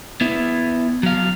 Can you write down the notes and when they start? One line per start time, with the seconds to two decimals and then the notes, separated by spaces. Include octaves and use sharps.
0.21 B3 E4
1.03 F#3 F5